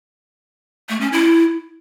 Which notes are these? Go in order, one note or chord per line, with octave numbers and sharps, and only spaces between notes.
A3
C#4
E4